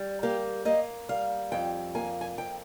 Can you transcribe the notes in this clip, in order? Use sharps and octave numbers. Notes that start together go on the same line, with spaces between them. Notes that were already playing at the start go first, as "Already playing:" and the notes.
Already playing: G3
A#3 G4
A#3 D#5
G3 F5
F2 G5
A#3 G#5
G#5
F2 G5